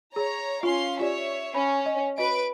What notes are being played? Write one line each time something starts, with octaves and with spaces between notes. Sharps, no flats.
G#4 C#5 A#5
C#4 F4 F5 C6
F4 G4 C#5 D5 E5
C#4 B5
D#5
F#4 B4 D#5 D7